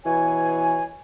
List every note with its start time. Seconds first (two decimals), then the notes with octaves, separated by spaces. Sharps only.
0.05 B2 E3 C#5 G#5